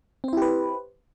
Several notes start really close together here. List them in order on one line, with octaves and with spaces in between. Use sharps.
C4 C5 E4 G4 B4